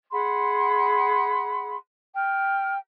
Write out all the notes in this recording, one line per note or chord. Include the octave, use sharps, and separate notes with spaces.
G#4 F#5 B5 C6
G5 F6